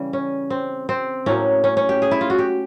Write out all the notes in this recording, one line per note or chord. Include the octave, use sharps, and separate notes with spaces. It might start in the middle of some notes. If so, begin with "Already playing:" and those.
Already playing: C#3 E3 G3
C#4
C4
C4
A2 F#3 A#3 C#4
C#4
C#4
G4
G#4
E4
F4
F#4
G4